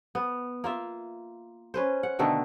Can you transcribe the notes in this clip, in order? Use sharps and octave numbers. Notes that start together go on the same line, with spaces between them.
B3
A#3 F4 E5
C#4 B4 C5
F#5
B2 D3 D#3 A3